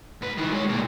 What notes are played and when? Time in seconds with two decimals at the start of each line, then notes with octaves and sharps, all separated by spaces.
0.22 G#2 B4
0.37 D#3 E3
0.52 G#3 C#5
0.68 C2 A#2